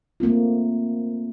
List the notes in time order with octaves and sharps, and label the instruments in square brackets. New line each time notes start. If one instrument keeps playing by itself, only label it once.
[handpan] A3 A#3 C4 F4